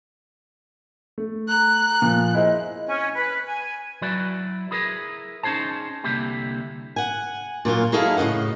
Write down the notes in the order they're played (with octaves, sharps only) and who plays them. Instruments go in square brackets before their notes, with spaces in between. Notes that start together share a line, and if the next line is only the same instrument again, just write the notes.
[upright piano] A3
[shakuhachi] A#5 [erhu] F#6
[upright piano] A#2 F3
[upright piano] E4 G#4 C5 [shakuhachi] D#5
[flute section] C#4
B4
G#5
[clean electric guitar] F#3 E4 F#4 B4 D5
E4 G#4 A#4 B4
C#4 D#4 G#4 C5 A5
C2 D3 A#3 E4 G4
[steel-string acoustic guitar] F#5 G#5
A#2 F#3 A#3 F4
F#3 D#4 E4 G#4 A4 F5
A2 C#3 F3 D#5 F#5